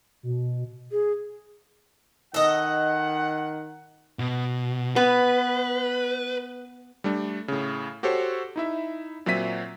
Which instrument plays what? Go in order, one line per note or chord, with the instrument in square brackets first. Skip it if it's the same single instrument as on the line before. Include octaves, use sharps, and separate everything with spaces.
[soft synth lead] B2
[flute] G#4
[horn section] D#3 F#5 [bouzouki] A4 D#5
[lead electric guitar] B2
[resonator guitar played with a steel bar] B3 [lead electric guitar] B4
[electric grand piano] G3 A3 D4
A2 C#3
F#4 G4 A4 C5 C#5
D#4 E4 E5
A#2 F#3 C4 E5 B6 D#7